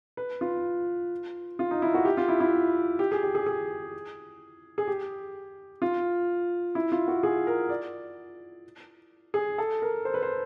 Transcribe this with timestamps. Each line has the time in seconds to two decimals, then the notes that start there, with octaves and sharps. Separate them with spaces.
0.17 B4
0.41 F4
1.59 F4
1.71 D#4
1.82 E4
1.94 F#4
2.05 G4
2.17 F4
2.28 E4
2.40 E4
2.99 G4
3.12 G#4
3.23 G4
3.35 G#4
3.46 G#4
4.78 G#4
4.88 G4
5.82 F4
6.75 E4
6.92 F4
7.08 F#4
7.23 G#4
7.47 A#4
7.69 D5
9.34 G#4
9.58 A4
9.82 A#4
10.05 C5
10.14 B4
10.22 C5